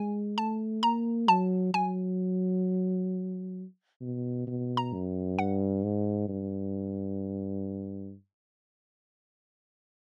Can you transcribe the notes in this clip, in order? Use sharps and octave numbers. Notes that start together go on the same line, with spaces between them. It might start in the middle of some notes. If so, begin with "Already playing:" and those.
Already playing: G#3 G#5
A3 A5
A#3 A#5
F#3 A5
F#3 G#5
B2
B2
A#5
F#2
G2 F#5
G#2
G2